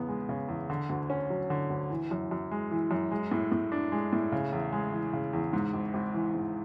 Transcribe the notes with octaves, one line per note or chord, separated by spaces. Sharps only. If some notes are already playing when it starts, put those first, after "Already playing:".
Already playing: E2 C#3 B3
G#3
C#3
E2
D3
D2
C#4
F#3
D3
D2
E3
F#2
F#2
G#3
E3
F#2
G#3
A2
A2
D4
G#3
A2
C#3
E2
G#3
E3
C#3
E2
G#2
G#1
G#1
E3
G#2